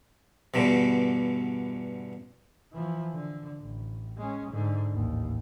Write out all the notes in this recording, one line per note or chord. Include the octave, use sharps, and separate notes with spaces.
E2 G2 B2 D3
E3 F3
D3
A1
G#3 C#4
G#2 D3
A1 D#2